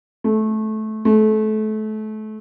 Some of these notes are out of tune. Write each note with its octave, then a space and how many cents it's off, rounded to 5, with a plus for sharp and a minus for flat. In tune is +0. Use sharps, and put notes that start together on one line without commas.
A3 -20
A3 -30